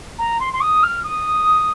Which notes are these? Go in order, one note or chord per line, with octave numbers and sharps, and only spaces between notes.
A#5
C6
C6
D#6
F6
D#6